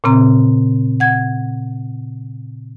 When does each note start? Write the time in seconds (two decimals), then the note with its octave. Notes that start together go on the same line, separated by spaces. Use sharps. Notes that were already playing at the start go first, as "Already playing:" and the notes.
0.04 A#2 C#3 C4 A#5
1.00 F#5 G#6